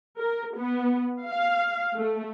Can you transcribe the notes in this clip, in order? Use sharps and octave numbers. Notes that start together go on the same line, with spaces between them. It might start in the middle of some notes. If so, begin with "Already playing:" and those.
A#4
B3
F5
A3